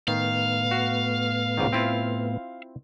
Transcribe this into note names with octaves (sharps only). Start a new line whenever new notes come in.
A2 D#3 B3 F5
F#4
C#2 G#2 D#3
C4 E4 F4